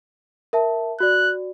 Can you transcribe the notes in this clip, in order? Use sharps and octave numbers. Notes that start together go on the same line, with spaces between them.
A#4 E5 A5
F#4 D5 F#6